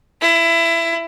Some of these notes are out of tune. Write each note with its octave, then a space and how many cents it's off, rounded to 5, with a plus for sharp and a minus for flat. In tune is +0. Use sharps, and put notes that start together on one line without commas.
E4 +20